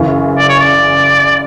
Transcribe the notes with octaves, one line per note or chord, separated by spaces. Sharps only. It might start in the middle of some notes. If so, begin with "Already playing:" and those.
Already playing: F#2 C#3 E3
D5
C#5
D5